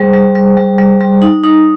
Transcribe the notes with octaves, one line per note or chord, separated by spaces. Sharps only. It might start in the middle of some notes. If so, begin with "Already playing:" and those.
Already playing: G3 G#4 C5
G3
G3
G3
G3
G3
D#4
D#4